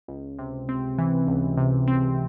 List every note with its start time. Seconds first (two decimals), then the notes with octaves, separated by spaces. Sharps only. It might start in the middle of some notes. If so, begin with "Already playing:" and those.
0.08 C#2
0.39 C3
0.69 C4
0.98 E3
1.27 C#2
1.57 C3
1.88 C4